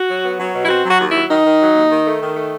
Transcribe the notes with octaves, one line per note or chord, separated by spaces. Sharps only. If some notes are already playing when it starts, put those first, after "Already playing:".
Already playing: F#4
F#3
B3
F#3
B2
E4
C4 F#4
F#3
F#4
D#2
F#3 E4
D#3 D#4
D#3
F#3
D#2
D#3
A3
D#3
A3